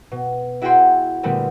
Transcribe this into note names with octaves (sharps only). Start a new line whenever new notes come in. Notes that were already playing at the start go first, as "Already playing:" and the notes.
B2
E4 F#4 G#4 F#5 G5 C6
A#2 D3 G3 A3 B3 C4